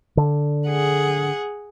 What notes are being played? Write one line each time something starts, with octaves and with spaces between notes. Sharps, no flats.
D3
G#4 F#5